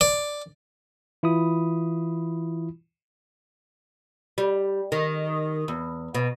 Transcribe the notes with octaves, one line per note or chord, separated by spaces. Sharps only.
D5
E3 E4 F4 B5 D#6
G3
D#3
E2
B2